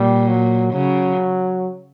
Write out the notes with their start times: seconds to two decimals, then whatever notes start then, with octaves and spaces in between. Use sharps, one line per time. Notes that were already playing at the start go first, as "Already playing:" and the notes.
Already playing: A#2 G3
0.28 F#3
0.73 C#3 F#3